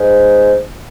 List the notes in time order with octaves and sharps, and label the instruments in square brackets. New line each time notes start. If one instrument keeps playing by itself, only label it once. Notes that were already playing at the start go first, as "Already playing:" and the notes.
Already playing: [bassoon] G#2